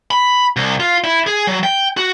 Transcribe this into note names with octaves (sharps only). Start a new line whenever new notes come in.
B5
C2
F4
E4
G#4
F#3
G5
F#4